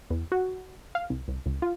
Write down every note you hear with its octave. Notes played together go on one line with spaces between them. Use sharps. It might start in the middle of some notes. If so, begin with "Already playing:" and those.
E2
F#4
F5
C2
C2
C#2
F4